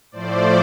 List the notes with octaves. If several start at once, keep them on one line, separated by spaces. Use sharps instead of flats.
A2 F3 A3 C5 D5